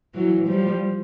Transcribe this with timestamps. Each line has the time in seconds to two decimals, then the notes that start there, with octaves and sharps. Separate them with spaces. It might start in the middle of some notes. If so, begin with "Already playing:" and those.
0.15 E3 F#3
0.48 F3 G3